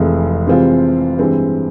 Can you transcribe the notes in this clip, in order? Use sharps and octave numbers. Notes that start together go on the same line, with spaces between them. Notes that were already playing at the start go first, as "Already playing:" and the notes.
Already playing: F1 F2 E3 G#3
C3 E3 G#3 C4 F4
G2 E3 G#3 C4